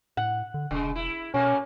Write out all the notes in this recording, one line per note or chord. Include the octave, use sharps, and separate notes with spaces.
A2 F#5
D3
E1 C#3 G#3
E4
B2 A3 A#3 C#4 F#4